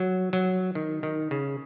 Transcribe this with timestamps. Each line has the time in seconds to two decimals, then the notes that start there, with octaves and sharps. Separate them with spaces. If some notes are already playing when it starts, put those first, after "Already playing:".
Already playing: F#3
0.33 F#3
0.75 D#3
1.03 D#3
1.31 C#3